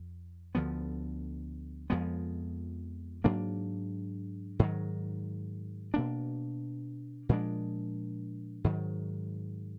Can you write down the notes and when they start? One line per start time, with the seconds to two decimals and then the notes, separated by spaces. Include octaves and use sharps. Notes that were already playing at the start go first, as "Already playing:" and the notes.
Already playing: F2
0.55 D2 D3 F3 B3
1.90 F2 F3 G#3 B3
3.24 G#2 F#3 A#3 D4
4.59 G#2 D#3 F#3
5.94 B2 A#3 D4
7.29 A#2 F3 G#3 D4
8.64 G#2 D#3 F#3